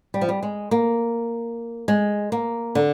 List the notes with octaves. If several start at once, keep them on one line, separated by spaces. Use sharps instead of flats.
G3
F3
G3
G#3
A#3
G#3
A#3
D3